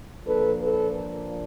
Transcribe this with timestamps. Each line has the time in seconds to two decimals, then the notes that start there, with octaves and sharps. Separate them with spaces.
0.24 A#2 F3 A#3 D4 A4 B4
0.61 A4 B4